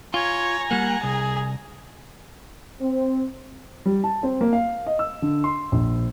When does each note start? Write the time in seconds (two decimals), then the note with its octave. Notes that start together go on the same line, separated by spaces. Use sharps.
0.14 F4 C#5 G#5 A#5
0.71 G3 A#3 F#5
1.03 C2 G#4
2.82 C4
3.86 G3
4.04 A5
4.23 C4
4.41 A#3
4.53 F5
4.86 D#5
4.99 E6
5.22 D3
5.44 C6
5.72 A#1